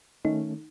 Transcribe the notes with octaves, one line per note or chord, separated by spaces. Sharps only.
D#3 A3 C#4 D#4